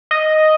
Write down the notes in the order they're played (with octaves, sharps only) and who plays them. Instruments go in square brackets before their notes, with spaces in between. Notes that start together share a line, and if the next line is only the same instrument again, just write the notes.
[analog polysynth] D#5